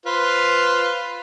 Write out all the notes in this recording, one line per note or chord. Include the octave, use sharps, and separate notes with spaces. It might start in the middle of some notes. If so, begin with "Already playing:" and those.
F4 B4 C5